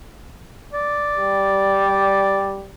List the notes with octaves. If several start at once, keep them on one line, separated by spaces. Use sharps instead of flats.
D5
G3